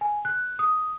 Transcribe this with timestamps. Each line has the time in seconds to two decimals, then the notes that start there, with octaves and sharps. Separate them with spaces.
0.01 G#5
0.25 F#6
0.59 D#6